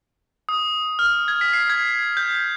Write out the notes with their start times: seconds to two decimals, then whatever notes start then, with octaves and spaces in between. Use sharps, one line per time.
0.49 D#6
0.99 F6
1.28 G#6
1.41 B6
1.53 C7
1.70 G#6
2.17 G6